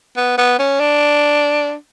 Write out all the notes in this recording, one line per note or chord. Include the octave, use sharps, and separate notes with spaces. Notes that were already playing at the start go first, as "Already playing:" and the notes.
B3
B3
C#4
D4